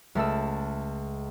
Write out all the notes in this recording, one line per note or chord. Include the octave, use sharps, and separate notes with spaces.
C#2 A3 A4 E6